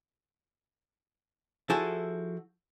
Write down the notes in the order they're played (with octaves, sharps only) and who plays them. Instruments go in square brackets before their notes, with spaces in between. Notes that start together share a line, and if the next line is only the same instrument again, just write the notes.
[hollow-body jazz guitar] F3 E4 F#4 G#4 A4